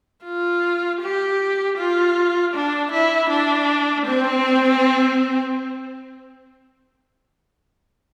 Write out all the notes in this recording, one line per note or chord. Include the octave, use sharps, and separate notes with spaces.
F4
G4
F4
D4
E4
D4
C4